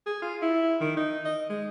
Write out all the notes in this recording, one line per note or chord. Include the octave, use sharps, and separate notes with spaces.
G#4
F4
E4
D#3
D#4
D#5
G#3